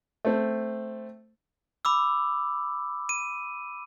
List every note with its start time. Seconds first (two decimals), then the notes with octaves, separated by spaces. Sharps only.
0.25 A3 C4
1.85 B5 D6 E6
3.09 D#7